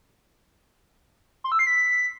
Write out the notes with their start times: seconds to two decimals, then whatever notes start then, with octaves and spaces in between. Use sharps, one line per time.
1.44 C6
1.52 E6
1.59 C7
1.67 B6